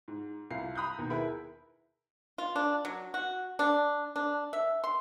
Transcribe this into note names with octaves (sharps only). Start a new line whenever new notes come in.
G#2
C2 F4 C7
A#5 B5 D#6 F#6 G6
D#2 B2
E4 G#4 A#4 B4 B5
F4
D4
F#3
F#4
D4
D4
E5
C6